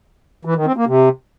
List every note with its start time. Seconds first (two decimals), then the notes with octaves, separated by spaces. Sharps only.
0.45 E3
0.56 D#3
0.66 C4
0.76 A#3
0.87 C3